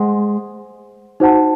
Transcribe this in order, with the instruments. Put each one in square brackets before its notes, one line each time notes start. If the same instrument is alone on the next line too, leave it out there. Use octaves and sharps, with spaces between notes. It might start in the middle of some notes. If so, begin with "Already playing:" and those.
Already playing: [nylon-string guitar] G#3 [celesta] C5 F#5 C6
[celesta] D#4 F#4 C5 F#5 A5